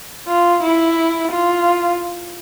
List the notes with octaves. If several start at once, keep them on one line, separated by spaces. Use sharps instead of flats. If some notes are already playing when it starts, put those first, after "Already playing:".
F4
E4
F4